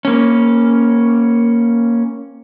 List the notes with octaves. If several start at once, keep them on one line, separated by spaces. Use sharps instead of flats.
A#3 C#4